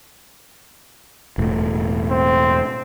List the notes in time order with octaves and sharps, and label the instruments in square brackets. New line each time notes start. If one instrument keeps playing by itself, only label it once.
[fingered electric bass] E1 A2
[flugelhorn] C4